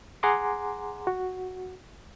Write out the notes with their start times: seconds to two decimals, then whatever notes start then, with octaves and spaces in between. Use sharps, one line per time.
0.23 G#4 F#5 G#5 A#5 C6 D6
1.07 F#4